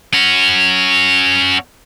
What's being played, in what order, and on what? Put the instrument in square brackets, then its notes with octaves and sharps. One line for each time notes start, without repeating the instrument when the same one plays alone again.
[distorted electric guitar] C#4 F#4